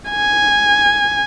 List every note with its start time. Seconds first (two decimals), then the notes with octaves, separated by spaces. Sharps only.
0.11 G#5